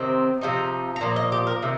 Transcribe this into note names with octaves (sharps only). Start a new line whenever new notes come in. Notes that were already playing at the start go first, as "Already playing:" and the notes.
Already playing: C3 D#3 C4
C3 F3 D#4
A#5
A#2 F3
D#5
G4
A#4
C3 D#3